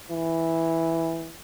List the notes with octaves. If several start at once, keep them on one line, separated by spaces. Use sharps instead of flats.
E3